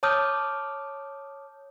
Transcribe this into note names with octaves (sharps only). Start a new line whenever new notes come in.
C#5 A5 D6 D#6 F6 G6